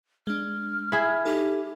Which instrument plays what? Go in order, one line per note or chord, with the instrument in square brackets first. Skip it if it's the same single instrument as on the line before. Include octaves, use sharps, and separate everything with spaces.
[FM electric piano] G#3 D4 [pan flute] F6
[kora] E4 G#4 [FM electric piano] B6
[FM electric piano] D#4 A4 [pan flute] G4